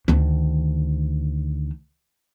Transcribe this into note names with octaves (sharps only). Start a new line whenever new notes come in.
D2 D#3